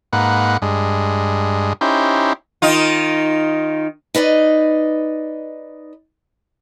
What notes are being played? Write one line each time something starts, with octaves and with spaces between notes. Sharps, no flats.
G#2 A#3 B4 F#5
G2 G#3
C#4 D#4 E4 G4 C5
D#3 D#4 F4
D#4 B4 D5 D#5